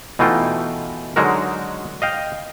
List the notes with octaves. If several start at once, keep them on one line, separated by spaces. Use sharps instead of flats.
B2 E3 A3 D#4 F4 G5
D3 F#3 G#3 D#4 F#4 A#4
D#5 F5 G5